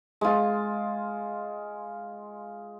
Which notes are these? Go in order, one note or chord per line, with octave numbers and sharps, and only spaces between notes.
G#3 F4